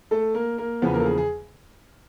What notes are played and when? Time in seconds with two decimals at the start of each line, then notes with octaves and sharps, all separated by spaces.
0.11 A3 A4
0.35 A#3 A#4
0.58 A#3 A#4
0.82 E2 C#3 F3 B3 B4
0.94 A#3 A#4
1.00 A4
1.06 G#4
1.18 G#4